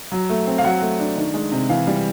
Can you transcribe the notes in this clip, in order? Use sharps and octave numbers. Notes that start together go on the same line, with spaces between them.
F#3
A3
C4
F5
F#3 F#5
A3
D4
D#3
G#3
C3
E3 F5
G3